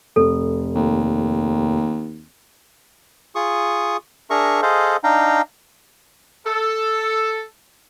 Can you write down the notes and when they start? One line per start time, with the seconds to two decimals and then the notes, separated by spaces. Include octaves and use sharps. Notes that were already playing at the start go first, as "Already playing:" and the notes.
0.16 F1 A4
0.75 D#2
3.35 F4 G#4 C#6 D#6
4.30 D4 G#4 A#4 E5 A#5 C#6
4.62 G#4 A4 C5 D#5 F5
5.04 D4 D#4 F5 G5 A#5
6.46 A4